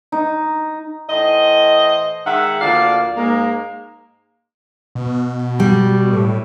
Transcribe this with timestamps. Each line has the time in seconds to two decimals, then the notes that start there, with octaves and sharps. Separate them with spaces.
0.12 D#4
1.10 A2 E3 C5 D#5
2.27 D#3 G#3 E5 F#5
2.61 D2 F3 A#3 D5 F5
3.17 G#2 G#3 A#3
4.95 B2
5.60 G3
6.13 A2